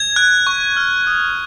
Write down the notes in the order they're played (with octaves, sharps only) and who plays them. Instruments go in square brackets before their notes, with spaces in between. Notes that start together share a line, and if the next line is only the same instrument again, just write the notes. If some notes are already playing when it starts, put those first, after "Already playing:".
Already playing: [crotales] G#6
F#6
C#6
F6
D#6